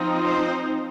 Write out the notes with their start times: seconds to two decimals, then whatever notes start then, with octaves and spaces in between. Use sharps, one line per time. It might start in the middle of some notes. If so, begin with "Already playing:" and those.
Already playing: F3 C4 D#4
0.22 C5